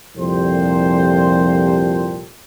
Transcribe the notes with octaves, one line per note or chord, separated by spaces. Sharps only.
C2 F2 A#2 G4 A4 C5